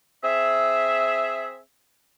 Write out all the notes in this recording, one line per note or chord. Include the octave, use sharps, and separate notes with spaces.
C4 G#4 E5